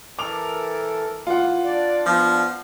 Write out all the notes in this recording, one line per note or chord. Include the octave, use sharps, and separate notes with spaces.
E3 A4 A#4 D6 F7
E3 A#3 F4 F#5
D4 D5
F3 B3